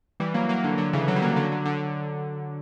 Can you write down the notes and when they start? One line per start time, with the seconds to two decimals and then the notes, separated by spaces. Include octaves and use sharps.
0.20 E3 G3
0.34 F#3 A#3
0.49 F#3 A#3
0.64 D3 F#3
0.78 D3 F#3
0.93 C#3 E3
1.07 D3 F#3
1.16 G3
1.22 F#3 A#3
1.36 D3 F#3
1.52 D3
1.65 D3